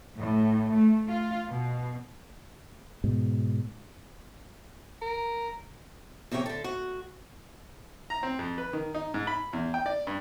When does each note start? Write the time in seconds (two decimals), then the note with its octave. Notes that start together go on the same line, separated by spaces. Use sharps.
0.17 A2
0.72 A3
1.09 F4
1.49 B2
3.04 G#2 B2
5.02 A#4
6.31 E2 C3 A#3 C#5 G5
6.46 D3 A4
6.64 F#4
8.10 A#5
8.23 C4
8.39 F2
8.58 B4
8.73 D#3
8.94 D#4
9.14 G#2
9.27 B5
9.53 E2
9.74 G5
9.86 D5
10.07 G2